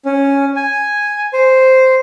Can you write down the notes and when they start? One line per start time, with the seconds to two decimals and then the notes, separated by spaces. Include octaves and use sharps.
0.05 C#4
0.56 G#5
1.33 C5